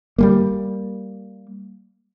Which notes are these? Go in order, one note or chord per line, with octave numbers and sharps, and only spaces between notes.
G3 G#3 A#3